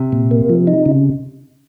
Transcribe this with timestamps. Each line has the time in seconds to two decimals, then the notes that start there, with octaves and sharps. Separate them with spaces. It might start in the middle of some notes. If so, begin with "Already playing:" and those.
Already playing: C3
0.12 A#2
0.31 A#3
0.49 F3
0.67 D#4
0.86 C#3